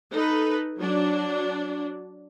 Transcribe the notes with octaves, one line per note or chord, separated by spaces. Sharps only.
D#4 A4 B4
F#3 D4